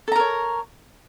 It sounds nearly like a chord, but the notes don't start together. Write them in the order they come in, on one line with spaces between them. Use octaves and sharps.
A4 A#5 A#4 C#5